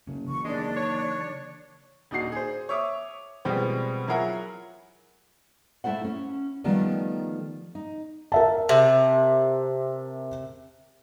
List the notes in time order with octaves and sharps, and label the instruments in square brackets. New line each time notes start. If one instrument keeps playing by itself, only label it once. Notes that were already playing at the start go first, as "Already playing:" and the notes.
[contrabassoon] F#1 [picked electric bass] C#3 C#4
[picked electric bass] C#3 E3 F#3 [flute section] C#6
[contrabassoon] D#2 [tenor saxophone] G#3 [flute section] D4
[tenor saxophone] C#5
[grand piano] D#1 D4 D#4 F#4 C7
G#4 C5
C#5 E5 D6 D#6
B2 F3 G3 G#3 B3 C4
F#3 E4 F4 G#4 A#4 F#5
[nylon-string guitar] A3 E4 A4 C5 F#5
C#4
D#3 F3 G3 A3 B3
D#4
[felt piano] A#4 E5 A5
[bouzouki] C3